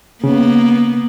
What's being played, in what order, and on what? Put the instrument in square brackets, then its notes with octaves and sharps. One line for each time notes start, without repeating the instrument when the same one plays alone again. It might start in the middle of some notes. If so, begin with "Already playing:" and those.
[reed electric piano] C#3 [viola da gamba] A#3 B3